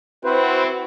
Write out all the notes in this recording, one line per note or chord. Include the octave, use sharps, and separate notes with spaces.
C4 E4 F#4 B4 C5